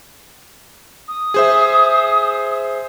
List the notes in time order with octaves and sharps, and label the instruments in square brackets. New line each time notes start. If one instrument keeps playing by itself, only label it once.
[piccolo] D#6
[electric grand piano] G#4 C5 E5